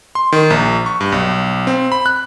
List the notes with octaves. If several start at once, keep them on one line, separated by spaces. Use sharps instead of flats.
C6
D#3
A#1
C#6
G2
B1
C4
B5
F#6